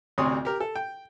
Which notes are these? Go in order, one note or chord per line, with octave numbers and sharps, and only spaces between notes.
A1 D2 C3 C#5 C6 D#6
G4 A#4
A4
G5